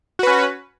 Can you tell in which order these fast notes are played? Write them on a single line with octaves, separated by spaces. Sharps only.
F#4 B4 C#4